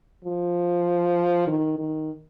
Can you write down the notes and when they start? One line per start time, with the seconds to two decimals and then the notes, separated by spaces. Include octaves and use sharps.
0.25 F3
1.48 D#3
1.79 D#3